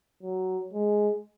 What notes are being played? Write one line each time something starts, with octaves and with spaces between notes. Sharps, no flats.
F#3
G#3